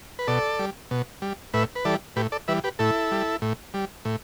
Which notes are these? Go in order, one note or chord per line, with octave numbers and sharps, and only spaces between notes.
B4
B2 A4 D5
G3
B2
G3
A2 B4 E5
B4
E3 G3 A4 D5
A2 G4 B4
A4 D5
E3 G3 B4 E5
G4 B4
A2 E4 A4
G3
A2
G3
A2